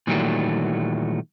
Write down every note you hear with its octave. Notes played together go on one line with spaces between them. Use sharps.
A#2 D#3 E3 F#3 G3 A3